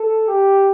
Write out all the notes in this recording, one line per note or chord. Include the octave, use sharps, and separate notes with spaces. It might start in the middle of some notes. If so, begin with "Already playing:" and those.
Already playing: A4
G4